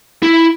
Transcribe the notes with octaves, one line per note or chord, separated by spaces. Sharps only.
E4